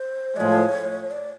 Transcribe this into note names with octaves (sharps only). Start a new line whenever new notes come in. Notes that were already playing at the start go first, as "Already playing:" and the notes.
Already playing: C5
A2 F3 G#3 C#5 D5
D5